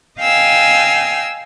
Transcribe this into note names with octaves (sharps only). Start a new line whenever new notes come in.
D#5 F5 G5 G#5 E6